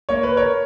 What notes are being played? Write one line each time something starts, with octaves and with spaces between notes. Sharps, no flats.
A#3 C#5
B4
A#4 C#5